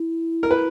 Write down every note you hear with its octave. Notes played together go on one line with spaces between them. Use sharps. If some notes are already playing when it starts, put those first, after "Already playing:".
Already playing: E4
A#4
B4